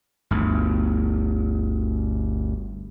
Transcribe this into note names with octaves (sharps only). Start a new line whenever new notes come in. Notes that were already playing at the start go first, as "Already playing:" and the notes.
G1 D2